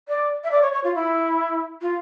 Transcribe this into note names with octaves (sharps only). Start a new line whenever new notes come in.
D5
E5
D5
C#5
C#5
F4
E4
F4